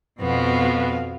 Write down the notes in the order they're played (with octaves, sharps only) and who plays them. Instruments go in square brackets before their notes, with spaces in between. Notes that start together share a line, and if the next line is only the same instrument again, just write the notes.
[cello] F2 F5 [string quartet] B2 B3 F#4